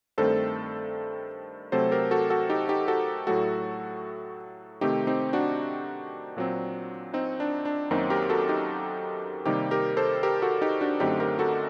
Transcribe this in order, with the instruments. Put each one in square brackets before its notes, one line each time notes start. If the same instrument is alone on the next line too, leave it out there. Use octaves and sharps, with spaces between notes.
[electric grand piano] G2 D#3 A3 C4 A4 C5
C3 F#3 A3 C4 A4 C5
G4 A#4
F#4 A4
F#4 A4
D#4 G4
D#4 G4
F#4 A4
A2 F#3 A3 F#4 A4
C3 D#3 A3 C4 D#4 G4
C4 D#4
D4 F#4
A#2 F#3 C4
C4 D#4
D4
D4
F#2 D#3 F#3 A#3 C4 D#4
G4 A#4
F#4 A4
D#4 G4
C3 D#3 G3 A#3 D#4 G4
G4 A#4
A4 C5
G4 A#4
F#4 A4
D#4 G4
D4 F#4
F#2 D3 A3 C4 D#4 G4
G4 A#4
F#4 A4